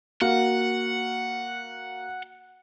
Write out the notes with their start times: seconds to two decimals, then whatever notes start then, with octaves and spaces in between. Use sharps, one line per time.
0.21 A#3 F#4 F5 F#5